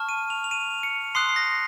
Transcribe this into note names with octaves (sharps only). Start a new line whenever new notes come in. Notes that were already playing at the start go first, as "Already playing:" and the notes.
Already playing: A5 C#6 F6
D#7
F7
F7
D#7
C#7
C6 D#6 F#6 C7
C7
A#6